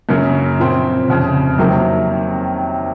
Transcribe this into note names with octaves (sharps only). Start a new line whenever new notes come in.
F#2 C#3 F#3 A#3 C#4
A#2 F3 C4
F1 F2 C#3
C3 D#3 F#3 A#3